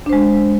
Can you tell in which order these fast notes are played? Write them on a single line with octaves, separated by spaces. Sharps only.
D4 C5 G#3